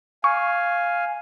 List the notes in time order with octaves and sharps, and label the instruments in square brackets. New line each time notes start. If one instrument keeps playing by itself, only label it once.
[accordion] F5 G#5 [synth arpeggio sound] C#6